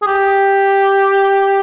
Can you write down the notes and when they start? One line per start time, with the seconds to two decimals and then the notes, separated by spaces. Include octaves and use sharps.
0.02 G#4
0.07 G4